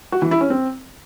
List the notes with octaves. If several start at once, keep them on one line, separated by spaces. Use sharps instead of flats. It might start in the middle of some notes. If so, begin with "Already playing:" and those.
F#4
E3
E4
C#4
C4